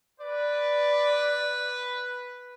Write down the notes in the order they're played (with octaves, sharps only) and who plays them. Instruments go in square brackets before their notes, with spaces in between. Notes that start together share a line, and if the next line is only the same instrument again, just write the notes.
[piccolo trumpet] B4 [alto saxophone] D5